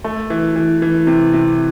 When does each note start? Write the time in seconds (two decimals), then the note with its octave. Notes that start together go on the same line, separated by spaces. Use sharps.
0.04 A3
0.30 E3
0.56 E3
0.82 E3
1.07 C3
1.33 C3